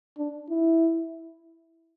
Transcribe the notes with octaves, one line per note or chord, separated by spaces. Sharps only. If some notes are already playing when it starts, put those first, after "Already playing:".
D4
E4